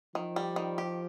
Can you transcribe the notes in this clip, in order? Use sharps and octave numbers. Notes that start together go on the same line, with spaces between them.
D#3 F3
G3
D#3
G4